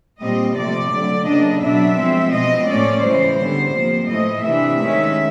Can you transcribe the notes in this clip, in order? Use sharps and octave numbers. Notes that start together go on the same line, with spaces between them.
A#2 G3 C4 D#5
C3 F3 A3 D5
D3 F#3 A3
C#3 F#3 A#3 D4 D#5
B2 F#3 B3 D4 E5
F3 G#3 C4
B2 G#3 C4 D#5
A2 F3 A3 C#4 D5
C#3 E3 G#3 C5
D3 G3 B3
C3 F3 A#3
A2 E3 A3 D#5
C3 E3 A3 D4 E5
D#3 G#3 C#4